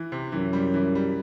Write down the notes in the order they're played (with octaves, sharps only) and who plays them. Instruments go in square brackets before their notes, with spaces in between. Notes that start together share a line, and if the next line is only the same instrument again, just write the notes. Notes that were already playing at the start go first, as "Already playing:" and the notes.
Already playing: [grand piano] E3
C3
[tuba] F#2 [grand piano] E3
[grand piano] G3
E3
G3